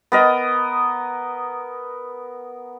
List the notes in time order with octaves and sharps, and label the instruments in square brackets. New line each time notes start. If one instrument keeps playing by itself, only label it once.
[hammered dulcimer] B3 A#4 D#5